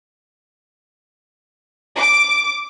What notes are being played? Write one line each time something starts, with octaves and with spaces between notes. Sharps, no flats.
D6